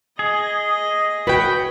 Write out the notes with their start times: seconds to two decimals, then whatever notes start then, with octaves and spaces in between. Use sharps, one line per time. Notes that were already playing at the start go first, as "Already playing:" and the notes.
0.19 G#4 D#5
1.27 F#4 B4 C#5 G5